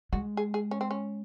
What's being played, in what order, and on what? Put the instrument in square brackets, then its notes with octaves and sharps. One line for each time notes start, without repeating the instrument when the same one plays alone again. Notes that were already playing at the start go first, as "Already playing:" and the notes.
[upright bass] G#3 [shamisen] F#4
[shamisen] G#4
G#4
C#4
C4
C#4